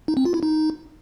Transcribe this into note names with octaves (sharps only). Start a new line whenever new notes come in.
D#4
C4
F4
E4
D#4